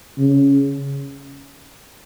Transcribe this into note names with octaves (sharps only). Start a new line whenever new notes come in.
C#3